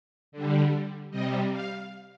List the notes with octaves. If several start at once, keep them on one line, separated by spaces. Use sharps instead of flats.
D3 G3
C3 G3 D#5
F5